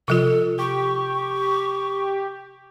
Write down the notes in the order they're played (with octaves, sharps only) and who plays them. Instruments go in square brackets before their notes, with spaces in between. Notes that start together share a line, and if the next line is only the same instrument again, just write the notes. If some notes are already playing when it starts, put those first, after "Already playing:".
[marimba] C3 F3 F4 [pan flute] A4
[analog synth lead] G4 [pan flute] C#6